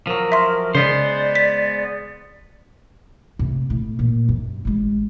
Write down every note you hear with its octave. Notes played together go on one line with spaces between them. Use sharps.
F3 F#3 A#4
E5 C6
C#3 G#3 B3 C5 D5
B6
A2 C3
A2
A#2
F#2
A1 G#3